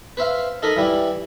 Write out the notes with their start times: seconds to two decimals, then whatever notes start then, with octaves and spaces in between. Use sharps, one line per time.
0.17 B4 C5 E5 F5
0.62 D#4 A4 A#4 B5 D#6
0.77 E3 G3 E4